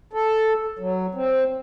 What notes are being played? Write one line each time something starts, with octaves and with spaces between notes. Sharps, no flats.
A4
F#3
C4